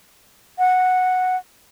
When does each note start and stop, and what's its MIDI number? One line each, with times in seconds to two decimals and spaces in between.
0.59 1.37 78